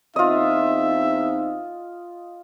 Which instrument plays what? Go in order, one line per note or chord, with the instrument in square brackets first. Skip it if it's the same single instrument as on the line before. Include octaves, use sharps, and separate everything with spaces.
[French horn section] E2 C4 D#4 [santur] F4 D#5 [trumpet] E5